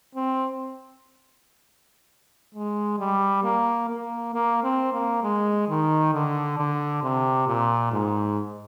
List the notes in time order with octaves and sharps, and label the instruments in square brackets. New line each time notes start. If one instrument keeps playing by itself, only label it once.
[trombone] C4
G#3
G3
A#3
A#3
A#3
C4
A#3
G#3
D#3
D3
D3
C3
A#2
G#2